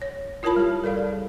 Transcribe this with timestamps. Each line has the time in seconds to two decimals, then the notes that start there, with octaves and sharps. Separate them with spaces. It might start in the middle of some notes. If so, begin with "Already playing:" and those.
0.02 C#5
0.43 E4 F4 A#4 C#5 A5 B5
0.56 G3 G4
0.84 A4 A#4 D5 F5
0.97 G#4